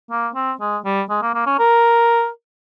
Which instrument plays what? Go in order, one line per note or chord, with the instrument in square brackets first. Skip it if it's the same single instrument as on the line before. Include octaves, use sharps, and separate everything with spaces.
[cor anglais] A#3
C4
G#3
G3
G#3
A#3
A#3
C#4
A#4